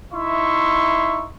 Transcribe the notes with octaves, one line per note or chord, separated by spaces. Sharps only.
D#4 E4 E5 C6 C#6